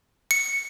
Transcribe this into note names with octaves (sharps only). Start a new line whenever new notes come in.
C#7